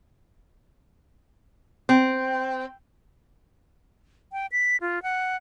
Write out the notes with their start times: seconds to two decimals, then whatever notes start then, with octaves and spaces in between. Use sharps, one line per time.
1.89 C4
4.32 G5
4.52 B6
4.81 F4
5.03 F#5